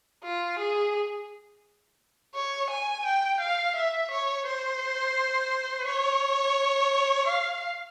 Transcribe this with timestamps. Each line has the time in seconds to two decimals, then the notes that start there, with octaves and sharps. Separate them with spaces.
0.23 F4
0.59 G#4
2.34 C#5
2.70 G#5
3.05 G5
3.40 F5
3.75 E5
4.11 C#5
4.46 C5
5.86 C#5
7.27 F5